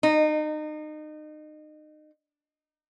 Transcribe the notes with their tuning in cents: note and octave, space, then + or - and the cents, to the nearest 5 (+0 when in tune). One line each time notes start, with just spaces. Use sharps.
D#4 -30